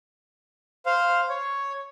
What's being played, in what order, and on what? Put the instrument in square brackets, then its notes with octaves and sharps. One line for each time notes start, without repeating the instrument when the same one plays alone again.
[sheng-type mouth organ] C5 F5
C#5